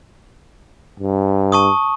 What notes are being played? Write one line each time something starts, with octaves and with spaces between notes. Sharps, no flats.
G2
A5 C#6 D#6